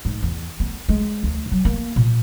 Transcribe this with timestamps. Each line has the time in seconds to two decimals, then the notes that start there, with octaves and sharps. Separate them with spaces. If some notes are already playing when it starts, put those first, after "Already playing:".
0.05 G#2
0.23 E2
0.60 B3
0.89 G#3
1.23 D2
1.52 F#3
1.65 A#3
1.96 A#2